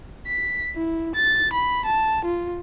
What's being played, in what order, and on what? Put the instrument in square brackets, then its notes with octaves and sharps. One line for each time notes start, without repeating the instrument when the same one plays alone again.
[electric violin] B6
E4
A6
B5
A5
F4